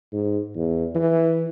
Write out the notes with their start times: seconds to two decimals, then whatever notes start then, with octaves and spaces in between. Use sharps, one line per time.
0.13 G#2
0.55 E2
0.95 E3